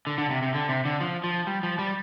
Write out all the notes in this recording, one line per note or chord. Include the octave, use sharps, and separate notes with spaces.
D3
D3
C3
C3
D3
C3
D3
F3
F3
G3
F3
G3